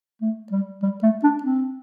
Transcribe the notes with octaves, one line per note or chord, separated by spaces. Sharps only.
A3
G3
G3
A3
D4
C4